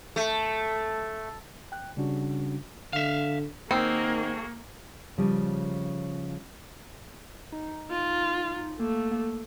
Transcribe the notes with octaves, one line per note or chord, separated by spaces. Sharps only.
A3
G5 F#6
C#3 G3 C#4 D4 F#4
D3 E5 F5
D#3 A#3 C4 F#4 G#4 E6
C#3 F3 G3
D#4
F4
A3 A#3
A#3